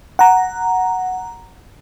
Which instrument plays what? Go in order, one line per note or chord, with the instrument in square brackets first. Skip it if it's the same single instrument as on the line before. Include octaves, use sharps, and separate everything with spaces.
[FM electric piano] F#5 A#5